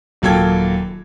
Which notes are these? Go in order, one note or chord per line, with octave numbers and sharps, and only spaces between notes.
D#1 F#3 A#3 A4 G5 G#6